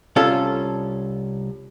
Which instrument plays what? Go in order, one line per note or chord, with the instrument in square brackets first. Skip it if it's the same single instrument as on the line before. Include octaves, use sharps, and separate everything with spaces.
[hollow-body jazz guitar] C2 C#4 F4 A4